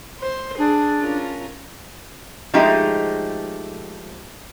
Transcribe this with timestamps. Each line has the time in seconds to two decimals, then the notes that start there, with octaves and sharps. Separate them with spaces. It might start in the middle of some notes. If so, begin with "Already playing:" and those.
0.21 C5
0.58 D4 G#4
0.99 C#4 F4 A#4
2.54 F3 G#3 A3 D#4 G4